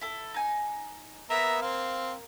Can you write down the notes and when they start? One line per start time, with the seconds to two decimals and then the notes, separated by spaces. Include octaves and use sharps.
0.01 E4 A4
0.34 D#4 G#5
1.30 A#3 B3 A#4 E5 A#5
1.62 C4 F5